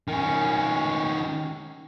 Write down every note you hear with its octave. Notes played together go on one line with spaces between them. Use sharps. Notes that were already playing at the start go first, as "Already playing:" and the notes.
D#3 C#4